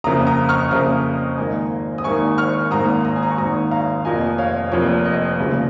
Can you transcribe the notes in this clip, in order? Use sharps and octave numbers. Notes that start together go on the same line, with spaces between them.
F2 C#3 A#3 A#5 D#6
A#5 D#6
C#6 F6
F2 C#3 A#3 A#5 D#6
G#1 G#2 D#3 A#3 D#5 G#5
D#6
G#1 G#2 D#3 A#3 G#5 C#6
C#6 F6
G#1 G#2 D#3 A#3 A#5 D#6
A#5 D#6
G#5
A#5
C#6
G#1 G#2 D#3 A#3 A#5 D#6
F5 A#5
F1 F2 F3 A#3 D#5 G#5
C#5 F5
F1 F2 F3 A#3 C#5
D#5
F1 D#2 C#3 F3 G#3